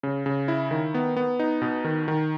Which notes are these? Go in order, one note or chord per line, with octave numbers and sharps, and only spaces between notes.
C#3
C#3
E4
D#3
B3
B3
D#4
B2
D#3
D#3